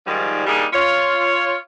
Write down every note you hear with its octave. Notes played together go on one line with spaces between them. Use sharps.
G#2 D#3 F3 G3
G3 A#3 D4 D#4 G#4
F4 C#5